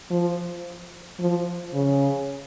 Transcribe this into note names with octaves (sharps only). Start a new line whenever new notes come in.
F3
F3
C#3